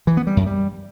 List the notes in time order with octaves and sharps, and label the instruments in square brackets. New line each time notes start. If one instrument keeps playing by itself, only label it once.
[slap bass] E3
B3
G3
F#2
G3